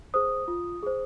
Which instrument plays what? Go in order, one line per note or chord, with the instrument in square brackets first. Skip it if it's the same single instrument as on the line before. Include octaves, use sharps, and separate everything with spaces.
[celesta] G#4 C5 D#6
F4
G#4 C5